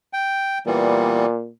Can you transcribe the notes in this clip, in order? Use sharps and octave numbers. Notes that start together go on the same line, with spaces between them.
G5
A#2 E3 G3 B3